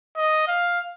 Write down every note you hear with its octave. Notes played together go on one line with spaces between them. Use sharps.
D#5
F5